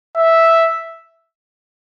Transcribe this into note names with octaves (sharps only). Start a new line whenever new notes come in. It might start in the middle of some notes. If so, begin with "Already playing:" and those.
E5